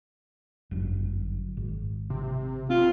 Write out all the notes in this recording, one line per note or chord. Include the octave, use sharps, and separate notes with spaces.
G1 F#2
G#1
C3
C4 F4